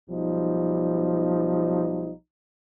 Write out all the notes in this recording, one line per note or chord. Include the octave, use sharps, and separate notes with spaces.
B1 F3 G3 D#4